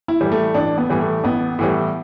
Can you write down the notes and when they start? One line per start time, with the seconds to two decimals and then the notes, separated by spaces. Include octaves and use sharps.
0.08 E4
0.20 A2 E3 G3
0.32 A3
0.54 A1 D4
0.78 B3
0.90 A2 E3 G3
1.01 A3
1.24 A1 B3
1.59 A2 E3 G3